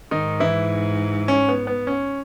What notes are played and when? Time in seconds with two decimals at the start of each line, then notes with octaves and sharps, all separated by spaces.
0.11 G#2 D#3 D#4
0.40 E3 E4
1.28 C#4
1.49 B3
1.67 B3
1.87 C#4